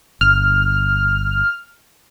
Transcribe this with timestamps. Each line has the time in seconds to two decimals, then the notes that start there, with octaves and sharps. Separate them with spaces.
0.21 G1 F6